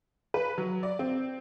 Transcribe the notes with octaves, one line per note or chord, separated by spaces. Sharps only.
B4
F#3
D5
C4